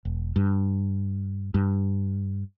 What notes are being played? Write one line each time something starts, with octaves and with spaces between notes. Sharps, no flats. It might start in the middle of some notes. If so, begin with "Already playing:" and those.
E1
G2
G2